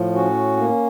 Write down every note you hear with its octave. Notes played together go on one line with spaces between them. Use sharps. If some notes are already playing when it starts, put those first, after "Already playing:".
Already playing: A2 F3
C#4 F#4
A#3